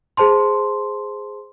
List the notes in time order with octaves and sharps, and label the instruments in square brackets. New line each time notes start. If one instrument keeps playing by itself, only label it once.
[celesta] G#4 C5 A5 C6